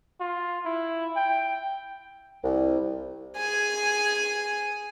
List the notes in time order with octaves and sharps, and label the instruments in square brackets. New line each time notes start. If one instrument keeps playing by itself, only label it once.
[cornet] F4
E4
G5
[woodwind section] C2
[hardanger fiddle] G#4 G#5